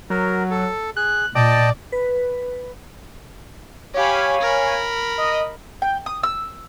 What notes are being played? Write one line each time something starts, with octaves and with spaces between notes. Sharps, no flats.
F#3 A#4
A4
G#4 F#6
A#2 D5 D#5 G5 A5
B4
G4 C#5 F5 G#5 B5
A#4 B5
D#5
G5
D#6
E6